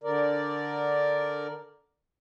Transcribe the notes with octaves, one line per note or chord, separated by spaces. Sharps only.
D3 A#4 D5